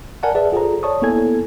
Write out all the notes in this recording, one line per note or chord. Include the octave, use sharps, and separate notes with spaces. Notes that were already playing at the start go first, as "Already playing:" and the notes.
A#4 D5 F#5 G#5 A5
G#4 B4 D5 E5 F#5 A5
F4 G#4 A4 C5 A#5
C#5 D5 A5 C#6 D#6
A#3 B3 E4 A4 G#5 G#6